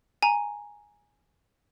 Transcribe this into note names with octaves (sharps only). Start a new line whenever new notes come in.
G#5 A#5